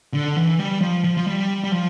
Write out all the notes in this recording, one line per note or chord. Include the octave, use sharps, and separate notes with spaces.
D3
E3
G3
F3
F3
F3
G3
G3
F3